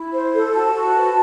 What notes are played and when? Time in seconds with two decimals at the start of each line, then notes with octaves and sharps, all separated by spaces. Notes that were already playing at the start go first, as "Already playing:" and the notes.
Already playing: E4
0.12 C5
0.33 A4
0.53 F#4 A5
0.73 F#4
0.94 B4